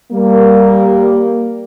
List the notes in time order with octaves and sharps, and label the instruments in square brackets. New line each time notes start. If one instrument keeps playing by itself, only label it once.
[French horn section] G3 A#3